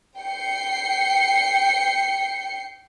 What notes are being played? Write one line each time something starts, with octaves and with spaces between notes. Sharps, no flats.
G5 C7 C#7